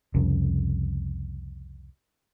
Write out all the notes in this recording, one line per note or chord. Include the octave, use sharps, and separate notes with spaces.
C2 F2 C#3